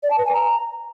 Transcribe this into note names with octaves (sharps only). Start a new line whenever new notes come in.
D5
A5
B4
G#5
A#5